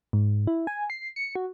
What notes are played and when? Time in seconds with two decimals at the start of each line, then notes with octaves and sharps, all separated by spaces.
0.13 G#2
0.47 E4
0.67 G#5
0.90 C7
1.16 C#7
1.36 F#4